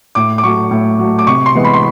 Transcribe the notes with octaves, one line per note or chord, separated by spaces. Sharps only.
A2 D6
D6
F#3 A3 C#6
A2
F#3 A3
D6
C3 C#6
C6
E3 G#3 B3
B5
C6